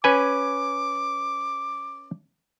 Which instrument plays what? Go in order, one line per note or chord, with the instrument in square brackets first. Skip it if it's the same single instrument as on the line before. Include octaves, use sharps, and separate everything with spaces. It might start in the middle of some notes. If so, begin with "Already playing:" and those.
[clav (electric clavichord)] C#4 B4 G#5 [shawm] D6